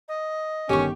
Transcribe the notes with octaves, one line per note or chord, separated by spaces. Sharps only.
D#5
G1 D#3 C#4 G4 C#6